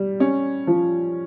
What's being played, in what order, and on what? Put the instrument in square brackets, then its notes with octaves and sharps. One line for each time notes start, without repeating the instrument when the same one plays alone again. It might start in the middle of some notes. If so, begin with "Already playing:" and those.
Already playing: [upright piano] G3
C#4
F3